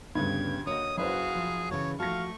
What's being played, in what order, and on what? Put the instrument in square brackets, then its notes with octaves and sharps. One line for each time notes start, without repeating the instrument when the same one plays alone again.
[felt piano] D2 [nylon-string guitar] G2 C#3 B3 [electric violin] G4 G#6
[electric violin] A#3 F#4 [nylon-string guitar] C#5 D#5 [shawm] D#6
[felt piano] F#1 B4 C5 [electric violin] F#4 F5 [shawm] G#4
[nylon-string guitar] F3
[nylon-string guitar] C#3 E3 A4 [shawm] C#5
[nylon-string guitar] F3 F#4 [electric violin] A3 C#6 [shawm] F5 [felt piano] A5 A#6